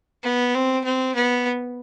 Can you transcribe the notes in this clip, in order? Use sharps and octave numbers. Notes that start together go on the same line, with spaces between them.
B3
C4
C4
B3